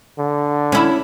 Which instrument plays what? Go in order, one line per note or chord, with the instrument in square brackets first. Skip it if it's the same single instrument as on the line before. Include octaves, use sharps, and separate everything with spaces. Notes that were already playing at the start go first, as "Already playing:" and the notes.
[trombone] D3
[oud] C#4 E4